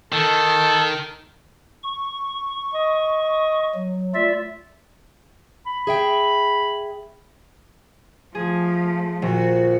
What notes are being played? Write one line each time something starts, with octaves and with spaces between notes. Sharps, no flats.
D#3 A4
C#6
D#5
F#3
A3 F4 D5 E5
B5
G#4 E5 G5
F3 A3 G#4
A#1 F#4